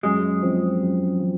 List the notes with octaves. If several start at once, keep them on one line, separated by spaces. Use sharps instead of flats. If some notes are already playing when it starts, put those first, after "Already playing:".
F#2 G#3
F3 C4
F#2
F3